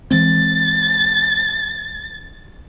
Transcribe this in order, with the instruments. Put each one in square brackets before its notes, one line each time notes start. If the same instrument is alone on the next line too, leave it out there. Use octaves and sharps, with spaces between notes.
[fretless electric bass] E3 G#3 C4 [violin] A6